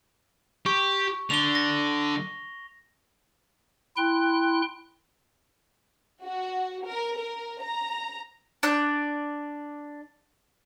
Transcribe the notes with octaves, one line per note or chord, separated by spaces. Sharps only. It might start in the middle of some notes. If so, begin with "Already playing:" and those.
G4 C#6
D3 F7 G7
A#6
E4 G5 C6 F#6
F#4
A#4
A#4
A#5
D4 D5 F#6 G6